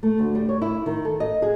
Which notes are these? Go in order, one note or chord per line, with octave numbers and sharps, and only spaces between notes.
A3
D2
G3
C#5
E4
D#3
A4
D#5
G#4